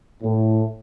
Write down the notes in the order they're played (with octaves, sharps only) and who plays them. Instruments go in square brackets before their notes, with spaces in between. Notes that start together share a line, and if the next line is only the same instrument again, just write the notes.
[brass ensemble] A2